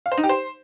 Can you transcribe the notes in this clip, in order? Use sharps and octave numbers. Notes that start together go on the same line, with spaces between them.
F5
C5
D#4
G4
C5